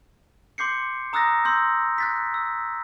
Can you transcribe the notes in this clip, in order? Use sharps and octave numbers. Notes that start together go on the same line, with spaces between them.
C6 D6 G6 C7 C#7
A#5 D#6 E6 F#6 A6 A#6
C6 E6 G6
F#6 A6 B6
E6